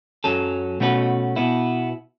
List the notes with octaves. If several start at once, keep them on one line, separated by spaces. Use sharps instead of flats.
F#2 F#3 C#4 A4
B2 A3 C#4 F#4 B4
B2 B3 E4